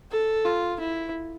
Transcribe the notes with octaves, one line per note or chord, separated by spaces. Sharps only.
A4
F4
E4